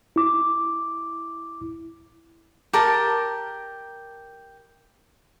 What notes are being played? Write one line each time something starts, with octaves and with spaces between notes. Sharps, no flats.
E4 D6
G4 A#4 A5